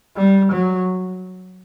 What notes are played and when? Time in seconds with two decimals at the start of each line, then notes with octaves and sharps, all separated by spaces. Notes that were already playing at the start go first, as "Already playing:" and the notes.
0.16 G3
0.52 F#3